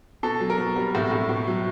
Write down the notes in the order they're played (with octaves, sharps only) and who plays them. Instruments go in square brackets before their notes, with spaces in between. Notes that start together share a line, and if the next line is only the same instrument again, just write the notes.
[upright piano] B2 A4
F#3
A#4
B2
G3
A2
A2
B2
F#3